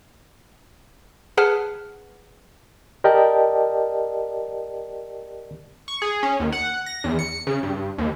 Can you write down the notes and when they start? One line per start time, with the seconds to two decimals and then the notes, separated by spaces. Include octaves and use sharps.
1.37 G#4 B4 F#5 A5 F6
3.04 G4 A#4 D5 D#5 G5 A5
5.88 C#6
6.02 G#4
6.23 C#4
6.40 D#2
6.52 F#5
6.86 A#6
7.04 E2
7.19 C#7
7.47 C#3
7.63 G2
7.98 D#2